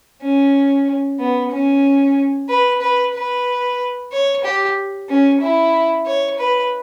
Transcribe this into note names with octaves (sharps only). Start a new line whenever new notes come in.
C#4
B3
C#4
B4
B4
B4
C#5
G4
C#4
E4
C#5
B4